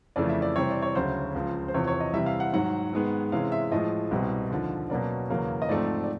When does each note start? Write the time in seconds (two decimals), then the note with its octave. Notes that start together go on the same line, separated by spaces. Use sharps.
0.16 F2 C#3 E3 A3 D5
0.29 E5
0.42 D5
0.55 C3 E3 G3 C4 C#5
0.71 D5
0.82 C#5
0.95 D2 C#3 F#3 C5
1.35 C#2 C#3 F3
1.68 C5
1.74 E2 C3 F3 C#5
1.87 C#5
2.00 D#5
2.13 C3 E3 G3 E5
2.26 F5
2.40 F#5
2.53 G#2 D#3 F#3 F#5
2.93 G#2 D#3 G#3 B3
3.32 C3 E3 G#3 C#4 F5
3.52 E5
3.72 A2 F3 G#3 D#5
4.11 C2 B2 G3 C4
4.50 D#2 D3 F3
4.90 B2 F#3 A#3 C#4 D5
5.29 E2 C#3 F#3 A#3 C#4
5.62 D#5
5.69 G#2 F3 A3 C4 D5
6.04 D5